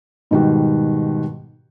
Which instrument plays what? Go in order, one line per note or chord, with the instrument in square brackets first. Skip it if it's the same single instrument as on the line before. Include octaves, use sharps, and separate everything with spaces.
[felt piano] G#2 B2 D#3 G3 F#4